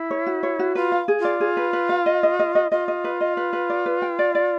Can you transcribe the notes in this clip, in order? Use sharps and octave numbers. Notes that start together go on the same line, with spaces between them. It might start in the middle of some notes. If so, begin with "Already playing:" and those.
Already playing: E4
C#5
F#4
C#5
F#4
F4 B4
F5
G#4
F4 D5
G#4
B4
B4
F5
D#5
D#5
D#5
D#5
F4 D#5
D#5
B4
D#5
B4
B4
D5
B4
G5
D5
D5